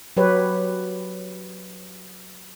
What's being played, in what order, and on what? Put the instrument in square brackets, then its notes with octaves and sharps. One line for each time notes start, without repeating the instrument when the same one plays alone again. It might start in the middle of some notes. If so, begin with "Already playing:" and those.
[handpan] F#3 G4 B4 C#5